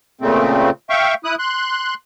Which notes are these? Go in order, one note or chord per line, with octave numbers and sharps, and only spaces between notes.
A#2 C#3 A3 C4
E5 F5 G5 C#6
E4 D#6 F#6
C6 F#6